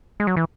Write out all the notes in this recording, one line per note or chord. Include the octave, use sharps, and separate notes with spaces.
G#3
F#3
E3